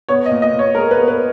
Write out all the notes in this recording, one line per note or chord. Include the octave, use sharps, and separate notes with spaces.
B3 C#5
D#5
A#2
D#5
A#2
C#5
G#3 A#4
B4
B3
B4